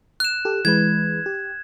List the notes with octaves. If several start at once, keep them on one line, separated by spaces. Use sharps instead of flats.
F#6 E7
G4 A4
E3 G#3 B4 G#6
G4